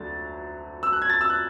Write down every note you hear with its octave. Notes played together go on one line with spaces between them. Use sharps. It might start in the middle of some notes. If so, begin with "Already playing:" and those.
Already playing: D2 D3 F#3 A6
E6
F#6
G#6
A6
E6
F#6